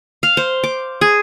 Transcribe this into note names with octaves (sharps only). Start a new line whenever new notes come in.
F5
C5
D6
G#4